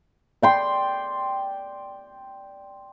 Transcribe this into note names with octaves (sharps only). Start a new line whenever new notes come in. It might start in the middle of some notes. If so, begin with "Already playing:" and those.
D5 G5 C6